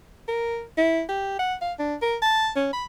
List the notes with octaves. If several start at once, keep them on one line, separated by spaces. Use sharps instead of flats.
A#4
E4
G4
F#5
F5
D4
A#4
A5
C#4
B5